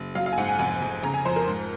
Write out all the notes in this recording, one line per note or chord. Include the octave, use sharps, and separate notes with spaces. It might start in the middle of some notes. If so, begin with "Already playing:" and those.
Already playing: F#1
F#3 F5
F5
G#5
G#2 F#5
G#5
F1 G#5
F1
C#3 A#5
G#5
F2 C5
A#4
G#2